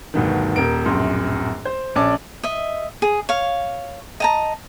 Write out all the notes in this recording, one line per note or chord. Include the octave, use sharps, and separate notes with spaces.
D2 G2 B2 D#3
D#1 A#4 D7
D1 A#1 F#2 C6
C5
A#1 C#4 D5 A5 D6
D#5 E5
G#4
C#5 F5
D#5 A5 A#5